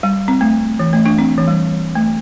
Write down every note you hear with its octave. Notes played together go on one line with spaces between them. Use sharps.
G3
C4
A3
E3
A3
A3 D4
C4
E3
G3
A3